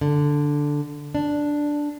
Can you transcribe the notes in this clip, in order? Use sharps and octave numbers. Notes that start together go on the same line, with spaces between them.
D3
D4